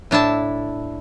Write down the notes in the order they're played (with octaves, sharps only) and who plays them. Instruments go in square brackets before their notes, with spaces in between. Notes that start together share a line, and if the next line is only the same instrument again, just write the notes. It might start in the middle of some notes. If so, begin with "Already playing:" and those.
[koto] A2 D4 E4 A5